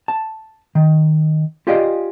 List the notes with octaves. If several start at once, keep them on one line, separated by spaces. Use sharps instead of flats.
A5
D#3
F4 G4 G#4 D5 D#5 F5